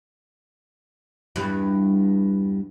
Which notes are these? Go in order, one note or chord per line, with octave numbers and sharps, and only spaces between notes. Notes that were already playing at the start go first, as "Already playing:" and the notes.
E2 G2